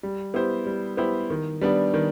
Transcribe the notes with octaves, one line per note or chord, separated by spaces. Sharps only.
G3
B3 E4 G4 C5
G3
B3 E4 G4 C5
D#3
G3 B3 D4
D#3